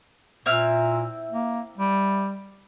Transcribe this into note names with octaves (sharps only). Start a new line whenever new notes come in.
A#2 C4 E4 F6
A#3
G3